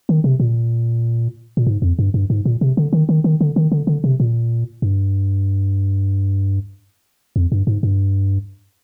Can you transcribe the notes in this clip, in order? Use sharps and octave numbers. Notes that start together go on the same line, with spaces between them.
D#3
C3
A#2
A#2
G#2
F2
G2
G2
G#2
A#2
C3
D3
D#3
D#3
D#3
D3
D#3
D3
D3
C3
A#2
G2
F2
G2
G#2
G2